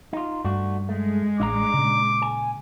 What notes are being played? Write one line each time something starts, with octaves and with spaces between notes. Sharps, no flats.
D#4 F4
G2 A3 D4 F#4
G#3 A3
A1 D4 E5 A#5 D6
A#2 C#3
G#5